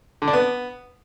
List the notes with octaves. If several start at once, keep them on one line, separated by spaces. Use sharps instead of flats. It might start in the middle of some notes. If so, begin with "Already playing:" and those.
D3
D4
B3